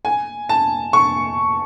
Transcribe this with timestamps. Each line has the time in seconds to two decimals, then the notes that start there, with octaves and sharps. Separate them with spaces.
0.05 G#5
0.49 A5
0.93 C#6